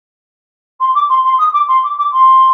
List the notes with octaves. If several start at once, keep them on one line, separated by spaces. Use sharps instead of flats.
C6
D6
C6
C6
D#6
D6
C6
D6
D6
C6